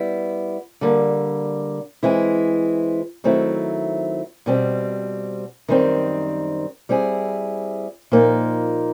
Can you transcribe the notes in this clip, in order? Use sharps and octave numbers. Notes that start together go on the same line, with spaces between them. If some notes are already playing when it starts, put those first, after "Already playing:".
Already playing: G3 B3 E4
D3 G3 A#3
E3 G#3 C4 E4
D#3 F#3 A3 C4 E4
B2 G3 C4
F#2 D#3 G3 C4
G3 C4 E4 G#4
A#2 F3 A#3 D#4